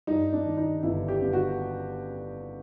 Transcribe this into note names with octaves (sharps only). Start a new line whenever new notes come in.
G2 D#4
D4
D#3
D#4
G1 E4
G4
G1
F#4